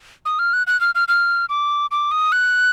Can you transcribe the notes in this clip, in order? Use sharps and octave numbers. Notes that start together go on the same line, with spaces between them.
D#6
F6
F#6
F#6
F6
F6
F6
D6
D6
D#6
F#6